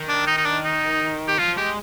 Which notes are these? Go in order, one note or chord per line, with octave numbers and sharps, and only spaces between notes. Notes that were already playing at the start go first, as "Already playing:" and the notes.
Already playing: D#3
D4
D#4
D#4
D4
D#4
G4
F3 F4
G#3 G4